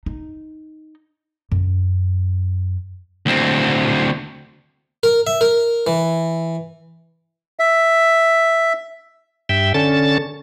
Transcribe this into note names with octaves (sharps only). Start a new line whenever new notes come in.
D#4
F#2
D2 C4
A#4
E5
A#4
E3
E5
G2 E5 G5
D3 C#4 A5 A6